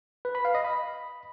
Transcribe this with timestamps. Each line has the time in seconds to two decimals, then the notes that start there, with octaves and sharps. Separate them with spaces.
0.25 B4
0.35 B5
0.45 F5
0.55 D#5
0.64 B5